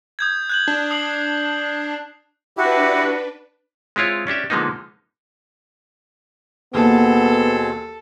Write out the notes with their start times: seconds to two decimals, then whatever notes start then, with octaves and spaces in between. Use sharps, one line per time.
0.19 D#6 G6 G#6
0.49 F#6 G6 F#7
0.67 D4 F#6
0.91 D#6 C7 F#7
2.57 D4 E4 F#4 G4 B4
3.96 G#3 C4 E4 F4 C#5
4.27 C#4 D4 G4 E5
4.50 D3 F3 G#3 A#3 B3 D#4
6.74 D#2 B2 B3 C4 G#4 A4